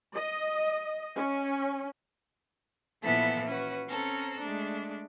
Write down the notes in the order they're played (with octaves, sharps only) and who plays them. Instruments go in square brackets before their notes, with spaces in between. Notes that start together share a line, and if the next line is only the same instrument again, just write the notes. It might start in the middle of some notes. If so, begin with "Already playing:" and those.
[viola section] D#5
C#4
[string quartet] A#2 E3 F3 B3 E4 A4
C#4 F#4 B4
C4 C#4 A4 A#5
G#3 A3 D4